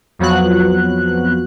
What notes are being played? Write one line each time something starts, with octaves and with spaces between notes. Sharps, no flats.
F2 F3 F#3 B3 F#4 F#6